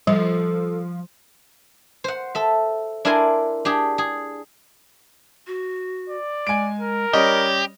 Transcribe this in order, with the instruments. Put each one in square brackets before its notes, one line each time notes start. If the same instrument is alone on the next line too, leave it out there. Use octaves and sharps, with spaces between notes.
[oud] F3 [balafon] G3 [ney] A4
[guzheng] C5 F#5
A4 E5
D4 E4 A#4 D5 G#5 C6
D4 G4 G#4
G#4
[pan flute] F#4
[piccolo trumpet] D5
[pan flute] G#3 [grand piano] G#5 D7
[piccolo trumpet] A#4
[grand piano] G3 C#4 D#5 [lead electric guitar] G4 [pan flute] C#5